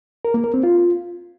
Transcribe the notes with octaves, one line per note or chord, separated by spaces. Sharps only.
A#4
A#3
A#4
C4
F4